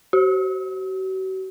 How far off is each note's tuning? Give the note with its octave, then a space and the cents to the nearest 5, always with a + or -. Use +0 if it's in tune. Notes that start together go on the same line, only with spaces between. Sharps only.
F#4 +40